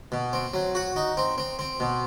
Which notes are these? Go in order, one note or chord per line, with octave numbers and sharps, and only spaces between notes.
B2
C4
F#3
F#4
D#4
C4
C4
C4
B2